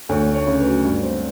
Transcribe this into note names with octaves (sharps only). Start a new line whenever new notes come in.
D2 C#5
A3
C#5
C#3
B4
F#3
G2
C4